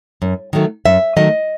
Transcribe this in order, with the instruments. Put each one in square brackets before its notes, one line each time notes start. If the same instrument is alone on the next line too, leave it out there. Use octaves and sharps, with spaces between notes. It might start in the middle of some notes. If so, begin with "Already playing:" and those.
[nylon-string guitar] F#2
D#3 F#3 A3
F#2 E5
D#3 F#3 A3 D#5